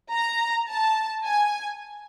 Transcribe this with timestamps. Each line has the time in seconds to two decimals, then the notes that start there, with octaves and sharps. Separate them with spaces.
0.12 A#5
0.68 A5
1.24 G#5